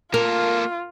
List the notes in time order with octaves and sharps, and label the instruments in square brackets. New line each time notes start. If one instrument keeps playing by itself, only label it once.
[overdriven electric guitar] A#3 A4 [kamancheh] F4 [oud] A#4